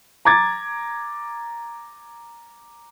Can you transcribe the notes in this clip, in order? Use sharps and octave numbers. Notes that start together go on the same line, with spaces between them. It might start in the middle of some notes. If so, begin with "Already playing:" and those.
A#5 D6 G#6 A6